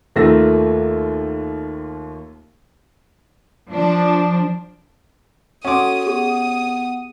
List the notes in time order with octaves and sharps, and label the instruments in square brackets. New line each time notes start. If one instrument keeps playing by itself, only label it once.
[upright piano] D#2 A3 A#3 F4 E6 A#6
[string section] F3 D4
[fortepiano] C#4 D6 [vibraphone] F#4 A4 [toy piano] F#5 C6 [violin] D#6
[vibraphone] B3 F#5 [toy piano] G4 G#4 [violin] D#6